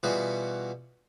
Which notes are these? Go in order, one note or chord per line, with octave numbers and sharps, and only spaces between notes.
B2 E3 G3 F4 F#4 G#4